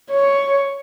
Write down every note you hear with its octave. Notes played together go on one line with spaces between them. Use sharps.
C#5